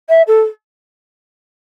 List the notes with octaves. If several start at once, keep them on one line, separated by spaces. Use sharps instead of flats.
E5
A4